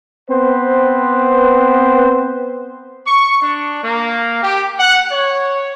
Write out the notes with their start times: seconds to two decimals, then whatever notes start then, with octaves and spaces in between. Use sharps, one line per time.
0.30 B3 C4 B4 C5
3.07 C#6
3.42 D4
3.83 A#3
4.43 G4
4.80 F#5
5.12 C#5